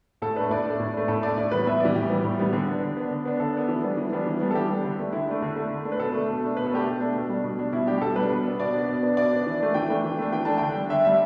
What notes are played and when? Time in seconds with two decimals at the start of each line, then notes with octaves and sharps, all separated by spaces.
0.22 A2 A4
0.36 A3 D4 B4
0.50 A2 D5
0.66 A3 D4
0.80 A2
0.94 A3 D4
1.08 A2 A4
1.23 A3 D4 D5
1.37 A2 D5
1.51 E3 G3 B3 B4
1.66 A2 E5
1.80 E3 G3 B3 D5
1.95 A2 G4
2.10 E3 G3 B3
2.24 A2
2.39 E3 G3 B3
2.53 D3
2.68 B3 D4
2.83 D3
2.97 B3 D4
3.11 D3
3.25 B3 D4
3.40 D3 A4
3.54 B3 D4
3.68 E3
3.83 G3 B3 D4
3.97 E3
4.12 G3 B3 D4
4.26 E3
4.40 G3 B3 D4
4.51 A4
4.55 E3 G4
4.70 G3 B3 D4
4.84 D3
4.99 A3 D4
5.12 D3 E4
5.27 A3 D4
5.42 D3
5.56 A3 D4
5.71 D3
5.85 A3 D4
5.92 B4
6.00 B2 A4
6.14 A3 D4
6.29 B2
6.43 A3 D4
6.57 B2 B4
6.66 A4
6.72 A3 D4 G4
6.84 B2 A4
7.00 A3 D4
7.15 B2
7.29 G3 D4
7.44 B2
7.58 G3 D4
7.72 B2 E4
7.87 D4 G4
7.90 G3
7.98 G4
8.02 B2 A4
8.16 G3 D4 B4
8.31 B2
8.45 B3 D4
8.59 B2 D5
8.74 B3 D4
8.88 B2
9.03 B3 D4
9.17 B2 D5
9.32 B3 D4
9.46 E3
9.60 A3 D4
9.74 E3 G5
9.90 A3 D4
10.04 E3
10.18 A3 D4
10.33 E3 G5
10.45 A3 D4 A5
10.57 D3 G5
10.75 G3 D4
10.90 D3 E5
11.05 G3 D4 E5